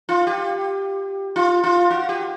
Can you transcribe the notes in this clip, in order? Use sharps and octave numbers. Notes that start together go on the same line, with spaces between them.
F4
G4
F4
F4
F#4
G4